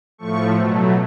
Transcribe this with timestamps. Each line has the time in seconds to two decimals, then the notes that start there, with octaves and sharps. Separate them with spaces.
0.18 A2 F3 A3 C#6
0.55 B2 F#3 A3